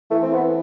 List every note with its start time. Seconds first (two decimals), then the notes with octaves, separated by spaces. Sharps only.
0.11 E3 A3
0.22 C4
0.34 B3